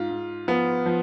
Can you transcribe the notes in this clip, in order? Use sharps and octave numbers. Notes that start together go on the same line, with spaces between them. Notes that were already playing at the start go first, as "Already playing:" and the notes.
Already playing: G#2 F4
G#2
F3 B3
F3